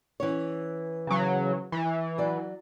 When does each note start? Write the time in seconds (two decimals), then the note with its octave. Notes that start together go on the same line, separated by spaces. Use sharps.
0.20 E3 C#4 C#5
1.07 C#3 F#3
1.72 E3
2.18 F#3 D5